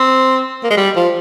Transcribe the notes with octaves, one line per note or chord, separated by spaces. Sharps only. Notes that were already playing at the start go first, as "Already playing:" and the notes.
Already playing: C4
A#3
G#3
G3
F3